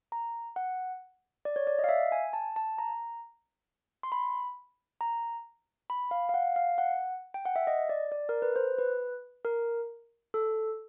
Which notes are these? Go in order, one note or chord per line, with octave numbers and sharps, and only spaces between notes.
A#5
F#5
D5
C#5
D5
D#5
F5
E5
G#5
A5
A5
A#5
C6
B5
A#5
B5
F5
F5
F#5
F5
F#5
G5
F#5
E5
D#5
D5
D5
A#4
B4
C5
B4
A#4
A4